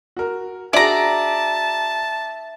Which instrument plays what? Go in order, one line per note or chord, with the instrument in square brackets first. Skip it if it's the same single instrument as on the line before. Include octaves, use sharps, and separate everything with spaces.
[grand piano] F#4 A#4
[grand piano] D4 F#4 G#4 [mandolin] D5 A#5 [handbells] E5 [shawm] A5